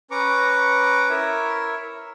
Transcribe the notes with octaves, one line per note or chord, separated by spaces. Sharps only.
C#4 B4 A#5 C#6 D6
E4 A#4 C#5 E5